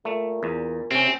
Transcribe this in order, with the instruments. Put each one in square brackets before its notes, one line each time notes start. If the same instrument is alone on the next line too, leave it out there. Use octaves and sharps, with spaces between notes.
[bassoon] A#2 [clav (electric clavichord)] A3
[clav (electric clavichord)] E2
[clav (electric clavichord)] C3 C#4 [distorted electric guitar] C4